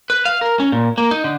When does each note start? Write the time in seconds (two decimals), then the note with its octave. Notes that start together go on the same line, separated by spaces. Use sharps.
0.10 B4
0.25 F5
0.41 A#4
0.60 C#4
0.72 A#2
0.98 A#3
1.11 D#4
1.24 D3